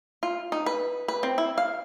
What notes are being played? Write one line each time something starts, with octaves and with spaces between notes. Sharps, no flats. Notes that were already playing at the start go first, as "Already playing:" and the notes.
F4
D#4
B4
B4
C4
E4
F5